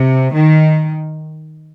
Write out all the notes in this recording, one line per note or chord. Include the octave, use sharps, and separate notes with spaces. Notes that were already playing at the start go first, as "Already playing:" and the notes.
Already playing: C3
D#3